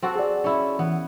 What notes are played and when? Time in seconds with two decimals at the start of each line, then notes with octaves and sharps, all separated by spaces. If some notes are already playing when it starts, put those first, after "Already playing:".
0.02 C4 F#4 A4
0.16 G#4 D5
0.44 C#4 E4
0.79 E3 B3